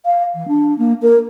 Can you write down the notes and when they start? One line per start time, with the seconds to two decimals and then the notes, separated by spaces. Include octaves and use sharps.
0.06 F5
0.35 E3
0.48 D4
0.78 A#3
1.02 A#4